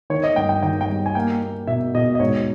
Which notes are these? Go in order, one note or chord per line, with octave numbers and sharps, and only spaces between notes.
D#3 C#5
D#5
G2 G5
G5
D#3 G5
G5
G3
G#5
A#3 G5
A#3
B2 E5
B2 D#5
D#5
G#2 C#5